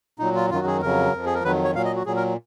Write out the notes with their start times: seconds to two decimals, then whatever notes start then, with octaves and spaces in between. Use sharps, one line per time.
0.19 A#2 F#3 D#4
0.35 F4
0.50 F#2 D#3 F#3 F4
0.59 F#4
0.67 G#4
0.82 F2 C#3 F#3 A#4
1.12 F2 F3
1.26 G#4
1.35 A#4
1.44 F2 D#3 F#3 B4
1.64 C#5
1.75 A#2 F#3 F5
1.85 D#5
1.96 F#4
2.05 A#2 F#3 G#4
2.16 A#4